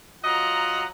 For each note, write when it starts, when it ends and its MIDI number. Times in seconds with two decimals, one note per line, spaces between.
0.24 0.86 54
0.24 0.86 65
0.24 0.86 75
0.24 0.86 78
0.24 0.86 82